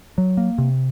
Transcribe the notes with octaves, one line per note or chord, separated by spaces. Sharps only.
F#3
A#3
C3